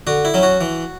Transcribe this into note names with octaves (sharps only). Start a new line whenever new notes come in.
D3 F#4
E4
F#3 C#4
F#4
E3